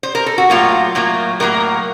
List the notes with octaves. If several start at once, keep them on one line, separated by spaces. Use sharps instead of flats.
C5
A#4
A4
F#4
A2 F#3 A#3 F4
A2 F#3 A#3
A2 F#3 A#3 A#4